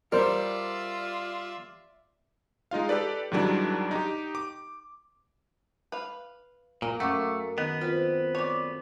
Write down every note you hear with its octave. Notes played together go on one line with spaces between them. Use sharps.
G3 F4 A#4 C5 D5 E5
G#3 D#4 F4 F5
G4 A4 B4 D5
G#2 D#3 F#3 G3 D4 E4
D#4 G4
D6
B4 F5
A#2 A#3
F#2 A3 F#5 C#6 D6
D#3 B3 D#4
C4 F4 B4
A3 C#5 D5